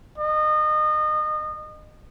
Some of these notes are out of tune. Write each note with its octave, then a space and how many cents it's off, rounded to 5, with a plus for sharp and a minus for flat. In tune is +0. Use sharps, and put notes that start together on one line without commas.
D#5 -30